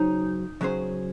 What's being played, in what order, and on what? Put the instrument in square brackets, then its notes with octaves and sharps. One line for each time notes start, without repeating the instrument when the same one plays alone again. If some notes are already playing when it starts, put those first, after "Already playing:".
Already playing: [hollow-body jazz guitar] C#3 F#3 C#4 G#4 C5 [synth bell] D#4
[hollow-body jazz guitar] C#3 F#3 C#4 G#4 C5